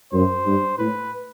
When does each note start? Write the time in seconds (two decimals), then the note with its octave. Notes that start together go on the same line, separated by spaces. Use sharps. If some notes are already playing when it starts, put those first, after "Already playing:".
0.13 F#2 C5
0.46 G2
0.78 A2 B4